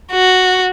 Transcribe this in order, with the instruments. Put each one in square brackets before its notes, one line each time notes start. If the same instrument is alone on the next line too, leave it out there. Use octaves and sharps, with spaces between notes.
[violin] F#4